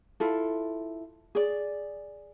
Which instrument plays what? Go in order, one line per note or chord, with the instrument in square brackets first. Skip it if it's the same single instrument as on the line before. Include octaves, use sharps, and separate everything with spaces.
[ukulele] E4 F4 A4
G#4 D5